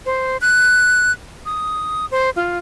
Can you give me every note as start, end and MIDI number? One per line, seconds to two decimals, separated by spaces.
0.06 0.37 72
0.41 1.12 90
1.46 2.06 87
2.11 2.30 72
2.36 2.58 65